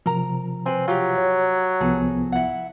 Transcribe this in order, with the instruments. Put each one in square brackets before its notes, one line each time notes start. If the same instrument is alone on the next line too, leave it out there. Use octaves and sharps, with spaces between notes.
[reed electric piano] C3 F3 [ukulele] A#4 A#5
[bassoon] C4 [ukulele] B4 G#5
[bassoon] F#3 [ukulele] F4 G4
[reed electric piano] C#5
[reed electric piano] C2 F3 B3 [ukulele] G#4 A4
[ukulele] E4 F#5